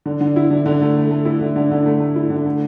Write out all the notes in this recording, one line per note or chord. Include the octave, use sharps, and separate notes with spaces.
D3
D3
E4
D3
D3
A3
A3
A3
E4
D3
D3
D3
A3
A3
E4
D3
A3